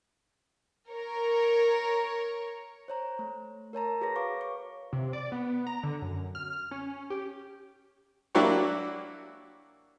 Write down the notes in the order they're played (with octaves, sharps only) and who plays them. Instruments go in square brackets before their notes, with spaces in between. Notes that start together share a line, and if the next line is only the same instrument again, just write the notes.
[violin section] A#4 C#5
[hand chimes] C5 C#5 A#5
A3
A#4 C#5 A5 A#5
F#4 G#4 B4 C#5 A#6
B4 C#5 F5 C#6 D6
C#6
[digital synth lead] C3
D5
B3
A#5
D3
F#2
F6
C#4
G4
[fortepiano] F#3 A#3 D4 E4 F#4 G4